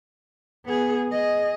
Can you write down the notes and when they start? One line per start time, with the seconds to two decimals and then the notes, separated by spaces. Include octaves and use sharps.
0.65 B3 G#4
1.09 G#4 D#5